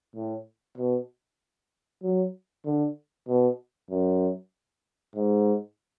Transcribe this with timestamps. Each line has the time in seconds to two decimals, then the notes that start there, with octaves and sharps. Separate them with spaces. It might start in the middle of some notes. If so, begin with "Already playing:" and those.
0.15 A2
0.77 B2
2.03 F#3
2.65 D3
3.28 B2
3.90 F#2
5.16 G#2